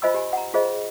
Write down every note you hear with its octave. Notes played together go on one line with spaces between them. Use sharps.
F4 C5 D#5 G#5 B5 E6
G4 D#5 G#5
F#5 A#5
F4 G#4 C5 D#5